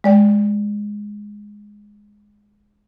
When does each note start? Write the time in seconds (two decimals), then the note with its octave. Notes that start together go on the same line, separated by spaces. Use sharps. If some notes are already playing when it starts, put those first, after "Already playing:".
0.04 G#3 D5 G5